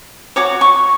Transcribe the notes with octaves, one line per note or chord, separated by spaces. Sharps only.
F#4 C#5 D6
C#6